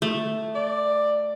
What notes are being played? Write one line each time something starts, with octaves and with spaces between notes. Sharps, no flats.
A3
D5